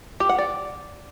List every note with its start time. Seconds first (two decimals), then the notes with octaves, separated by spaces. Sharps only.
0.20 G4
0.29 F#5
0.38 D5